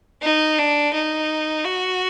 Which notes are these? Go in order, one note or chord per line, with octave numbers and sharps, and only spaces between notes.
D#4
D4
D#4
F#4